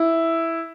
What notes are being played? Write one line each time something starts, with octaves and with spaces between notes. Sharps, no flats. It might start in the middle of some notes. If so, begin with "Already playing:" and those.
Already playing: E4